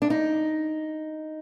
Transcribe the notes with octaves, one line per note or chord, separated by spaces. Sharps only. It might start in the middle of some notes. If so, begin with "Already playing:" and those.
D4
D#4